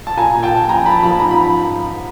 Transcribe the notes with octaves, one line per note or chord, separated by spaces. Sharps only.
A5
A#2 G#5 A#5
A#2
G5 A5
A#2
F3 G#5 A#5
F3 A5 B5
F3 A5 B5
G#2 A#5
B5